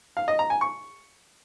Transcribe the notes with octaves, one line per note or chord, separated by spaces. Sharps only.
F5
D#5
A#5
G#5
C#6